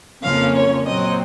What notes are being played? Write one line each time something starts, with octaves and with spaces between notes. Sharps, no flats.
F2 C#3 F3 A#3 C#4 F5
C#5
A#2 F#3 C4 D#5